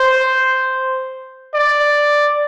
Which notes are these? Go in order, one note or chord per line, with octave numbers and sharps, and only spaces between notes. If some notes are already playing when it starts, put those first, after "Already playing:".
Already playing: C5
D5